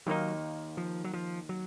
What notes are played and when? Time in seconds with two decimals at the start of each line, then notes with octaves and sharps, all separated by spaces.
0.06 D#2 D#3 F#3 A#3 D#4
0.77 F3
1.04 F#3
1.13 F3
1.49 F#3